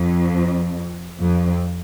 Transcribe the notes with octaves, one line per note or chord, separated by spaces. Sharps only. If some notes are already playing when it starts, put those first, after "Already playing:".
Already playing: F2
F2